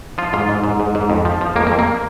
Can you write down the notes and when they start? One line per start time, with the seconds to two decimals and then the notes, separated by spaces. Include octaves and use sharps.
0.18 F3 F4
0.33 G#2 F4
0.49 G#2
0.64 G#2
0.80 G#2
0.95 G#2
1.10 F2
1.25 F3
1.41 F3
1.56 F2 A#3
1.67 A#3
1.72 F2
1.79 A#3